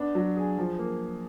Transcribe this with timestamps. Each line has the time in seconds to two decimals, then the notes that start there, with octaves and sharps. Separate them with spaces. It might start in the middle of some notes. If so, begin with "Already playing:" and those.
Already playing: B3 D4
0.15 F#3
0.36 G#4
0.58 F3
0.79 A#3